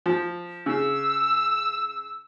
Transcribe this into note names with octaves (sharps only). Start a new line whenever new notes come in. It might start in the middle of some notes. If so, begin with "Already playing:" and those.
F3
C#3 E6